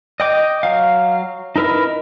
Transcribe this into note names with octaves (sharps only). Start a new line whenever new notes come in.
D#5 G5 D6
F#3 F5
D#4 E4 A#4 B4 D#5